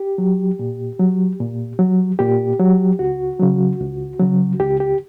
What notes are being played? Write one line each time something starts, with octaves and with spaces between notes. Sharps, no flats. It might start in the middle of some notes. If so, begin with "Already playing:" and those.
Already playing: G4
F#3
A#2
F#3
A#2
F#3
A#2 G4
F#3
C#2 F#4
C#3 F#3
C#2
C#3 F#3
C#2 G4
G4